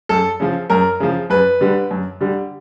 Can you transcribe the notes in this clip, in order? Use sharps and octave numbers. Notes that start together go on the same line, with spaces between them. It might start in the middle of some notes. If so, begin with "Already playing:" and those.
F#2 A4
C#3 F3
F#2 A#4
C#3 F3
F#2 B4
D3 G3
F#2
D3 G3